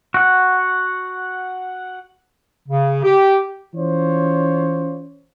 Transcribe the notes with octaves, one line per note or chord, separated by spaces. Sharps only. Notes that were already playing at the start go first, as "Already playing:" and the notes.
F#4 F#5
C#3
G4
E3 C#4 F4 C5 C#5